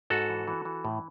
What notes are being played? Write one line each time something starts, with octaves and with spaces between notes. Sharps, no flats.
G#2 F#4 A4
E3
E3
E3
A2